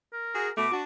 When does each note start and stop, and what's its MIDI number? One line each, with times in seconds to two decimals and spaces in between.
0.13 0.51 70
0.34 0.49 66
0.34 0.49 68
0.57 0.67 47
0.57 0.67 57
0.57 0.73 86
0.72 0.83 62
0.72 0.83 66